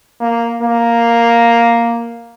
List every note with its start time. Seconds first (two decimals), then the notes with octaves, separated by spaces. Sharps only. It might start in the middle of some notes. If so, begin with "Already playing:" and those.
0.21 A#3
0.62 A#3